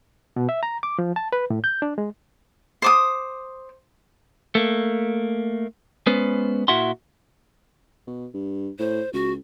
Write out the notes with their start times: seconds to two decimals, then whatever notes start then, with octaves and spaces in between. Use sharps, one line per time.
0.36 B2
0.49 E5
0.63 A#5
0.83 D6
0.99 F3
1.16 A5
1.33 B4
1.50 A2
1.64 G6
1.82 D4
1.98 G#3
2.82 C5 D6 D#6
4.55 A3 A#3
6.07 G#3 B3 C#4 B4 C5
6.68 A#2 E4 F#4 E5 F#5 C6
8.07 B2
8.34 G2
8.79 A2 C5
9.13 C#2 F#4